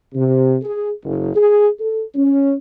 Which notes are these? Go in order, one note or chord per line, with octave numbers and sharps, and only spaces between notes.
C3
G#4
F#1
G#4
A4
C#4